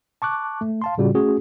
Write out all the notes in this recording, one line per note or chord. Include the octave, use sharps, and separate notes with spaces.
A5 C#6 D6 F#6
A3
F5 A5 C6
A2 C#3 G3 F4 F#4
A3 C#4 F#4 G#4